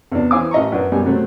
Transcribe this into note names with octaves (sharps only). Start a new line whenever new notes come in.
E2 C3 D4
E3 C5 F5 G#5 D6
A1 D#5 A#5 C#6
F#2 F#3 D4 F#4 B4
F#2 B2 G3 G#5
C3 F#3 A3 C4